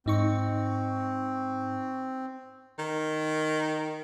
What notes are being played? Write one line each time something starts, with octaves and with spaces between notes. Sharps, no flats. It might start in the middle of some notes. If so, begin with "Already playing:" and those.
G#2 C4 D#4 C#6
D#3